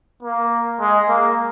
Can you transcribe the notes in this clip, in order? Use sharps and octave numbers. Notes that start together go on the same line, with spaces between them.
A#3
G#3
A#3